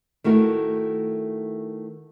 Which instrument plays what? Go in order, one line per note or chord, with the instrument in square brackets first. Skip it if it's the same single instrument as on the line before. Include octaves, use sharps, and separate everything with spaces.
[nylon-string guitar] D#3 A3 E4 F#4 A#4